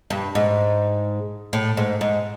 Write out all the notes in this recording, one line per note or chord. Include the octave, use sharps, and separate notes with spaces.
G2
G#2
A2
G#2
G#2